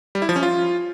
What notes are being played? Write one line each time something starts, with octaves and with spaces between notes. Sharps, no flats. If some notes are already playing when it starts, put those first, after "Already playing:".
G3
E4
F3
C#4
F4